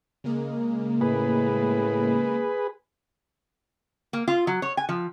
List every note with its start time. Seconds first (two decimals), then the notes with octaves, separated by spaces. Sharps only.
0.24 C#3 G#3 A#3
1.01 A2 G#4 B4
4.13 A#3
4.28 F4
4.47 F#3
4.62 C#5
4.77 G#5
4.89 F3